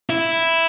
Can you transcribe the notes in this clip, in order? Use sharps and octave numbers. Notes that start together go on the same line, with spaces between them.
E4